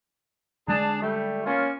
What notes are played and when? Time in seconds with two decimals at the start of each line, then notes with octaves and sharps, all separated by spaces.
0.68 D3 G#3 D4 G#4 A5
1.01 G3 A3
1.45 A#3 C#4 F4